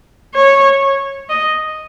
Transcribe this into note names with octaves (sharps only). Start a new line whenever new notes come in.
C#5
D#5